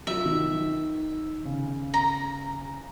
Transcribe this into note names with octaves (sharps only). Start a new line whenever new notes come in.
F#3 F4 E5
D#3
C#3
A#5